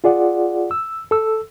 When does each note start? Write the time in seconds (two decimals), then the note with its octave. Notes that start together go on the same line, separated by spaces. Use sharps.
0.04 F4 G#4 D5 F#5
0.71 E6
1.11 A4 E6